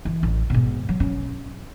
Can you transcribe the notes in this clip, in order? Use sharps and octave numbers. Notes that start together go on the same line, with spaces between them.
E3
A1
G#2 B2
F#3
C#4